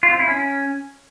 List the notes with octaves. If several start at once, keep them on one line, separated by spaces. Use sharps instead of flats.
F4
C4
E4
C#4